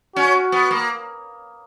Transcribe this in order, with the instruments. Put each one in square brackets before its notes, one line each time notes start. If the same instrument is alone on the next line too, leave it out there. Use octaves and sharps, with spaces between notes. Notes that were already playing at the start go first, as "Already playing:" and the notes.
[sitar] C#4 [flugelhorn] F#4
[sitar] B3
A#3